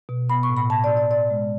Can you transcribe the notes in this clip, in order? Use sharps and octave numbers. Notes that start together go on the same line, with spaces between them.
B2
B3 B5
C#6
A2
B5
A2 A5
D5
A2
D5
B2 D5
G#3